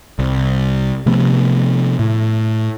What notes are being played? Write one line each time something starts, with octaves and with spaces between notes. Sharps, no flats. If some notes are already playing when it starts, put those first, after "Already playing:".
C2
C3 F3 A3 B3
A2